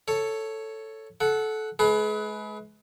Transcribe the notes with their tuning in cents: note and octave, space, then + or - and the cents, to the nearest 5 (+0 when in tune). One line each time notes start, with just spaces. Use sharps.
A4 +5 C#5 +0
A4 -20 F#5 +0
G#3 +40 G#4 +35 B4 +0